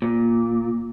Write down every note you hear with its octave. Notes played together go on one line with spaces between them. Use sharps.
A#2